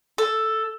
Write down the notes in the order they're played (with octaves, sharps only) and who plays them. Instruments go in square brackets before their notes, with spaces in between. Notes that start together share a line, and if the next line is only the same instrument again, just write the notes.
[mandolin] A4